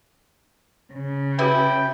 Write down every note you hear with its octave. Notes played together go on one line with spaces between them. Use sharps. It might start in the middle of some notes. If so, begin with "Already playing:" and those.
C#3
E4 F#4 G#4 B4 G5